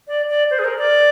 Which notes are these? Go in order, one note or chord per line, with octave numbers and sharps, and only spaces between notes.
D5
D5
C5
G#4
A#4
D5